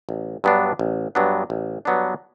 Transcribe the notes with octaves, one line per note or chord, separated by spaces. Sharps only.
A1
G2 F#3 B3 D4
A1
G2 F#3 B3 D4
A1
G2 F#3 B3 D4